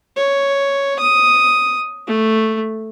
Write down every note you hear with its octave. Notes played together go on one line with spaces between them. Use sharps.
C#5
D#6
A3